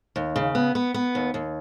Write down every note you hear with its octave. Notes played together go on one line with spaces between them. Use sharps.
D#2
C#3
B3
B3
B3
D#2
D#2